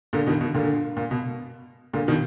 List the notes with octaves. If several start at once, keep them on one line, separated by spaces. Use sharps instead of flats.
A#2 D3
B2 D#3
B2
A#2 D3
A#2
B2
A#2 D3
B2 D#3